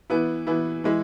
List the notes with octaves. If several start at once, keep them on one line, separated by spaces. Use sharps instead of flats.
E3 B3 E4
E3 B3 E4
E3 G#3 E4